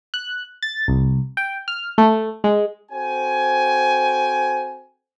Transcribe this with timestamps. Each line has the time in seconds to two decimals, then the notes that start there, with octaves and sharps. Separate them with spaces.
0.14 F#6
0.63 A6
0.88 C2
1.37 G5
1.68 F6
1.98 A3
2.44 G#3
2.91 C4 F#4 A4 C5 G5 G#5